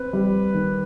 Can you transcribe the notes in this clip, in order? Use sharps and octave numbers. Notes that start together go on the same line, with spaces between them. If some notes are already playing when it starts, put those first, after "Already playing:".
Already playing: C4 B4
G3
D#3